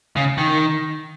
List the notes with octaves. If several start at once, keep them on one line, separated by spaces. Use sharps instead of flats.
C#3
D#3